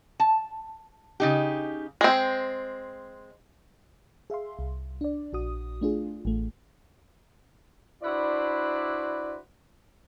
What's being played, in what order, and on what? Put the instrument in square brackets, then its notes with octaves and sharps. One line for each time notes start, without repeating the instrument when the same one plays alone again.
[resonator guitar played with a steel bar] A5
C#3 D#4 G4
[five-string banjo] G#3 C4
[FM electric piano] G#4 E5 F5 C6
C2
D4 D5
A#1 F#4 D#6
A3 D4 F4 G#4
A1 A3
[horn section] D4 E4 F#4 B4 C5 D5